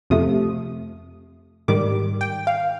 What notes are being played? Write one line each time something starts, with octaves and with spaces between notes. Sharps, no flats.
F2 C3 F3 A3 D#6
G#2 D#3 G3 D6
G5
F5